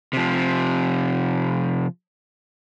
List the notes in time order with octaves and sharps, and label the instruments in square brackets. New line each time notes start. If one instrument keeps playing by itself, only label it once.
[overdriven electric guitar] C3 F3